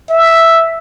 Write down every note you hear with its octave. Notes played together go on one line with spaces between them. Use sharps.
E5